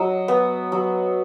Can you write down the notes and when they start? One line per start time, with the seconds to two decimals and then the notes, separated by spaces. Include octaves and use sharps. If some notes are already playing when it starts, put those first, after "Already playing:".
Already playing: F#3 D#5
0.28 B3
0.72 F#3